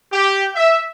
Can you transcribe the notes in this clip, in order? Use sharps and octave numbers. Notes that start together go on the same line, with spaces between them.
G4
E5